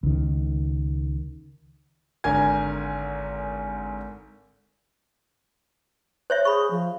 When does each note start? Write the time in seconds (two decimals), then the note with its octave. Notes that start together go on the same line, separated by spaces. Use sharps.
0.03 C#2 D#3
2.24 G#1 D3 A#4 G#5 G#6
6.30 C5 C#5 E5
6.45 G#4 B5 C#6
6.71 F3